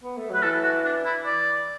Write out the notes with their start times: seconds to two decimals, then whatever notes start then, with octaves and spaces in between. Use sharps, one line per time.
0.03 B3
0.17 A3
0.30 F#3 B4
0.42 E3 A4
0.64 F#4
0.84 D4
1.05 E4
1.26 D5